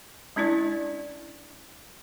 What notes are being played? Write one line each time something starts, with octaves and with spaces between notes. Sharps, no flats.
G#3 C#4 D4 E4 D5